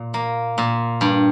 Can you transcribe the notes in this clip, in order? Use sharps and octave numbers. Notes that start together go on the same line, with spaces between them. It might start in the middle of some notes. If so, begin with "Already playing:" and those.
Already playing: A#2
A#3
A#2
G2